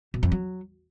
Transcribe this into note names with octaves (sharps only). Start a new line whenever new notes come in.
B2
F2
F#3